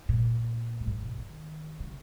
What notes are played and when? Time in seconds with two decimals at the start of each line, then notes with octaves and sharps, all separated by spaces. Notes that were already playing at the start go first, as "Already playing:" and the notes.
0.09 A#2
0.80 F#2
0.87 G#2
1.03 B2
1.18 D#3
1.80 C#3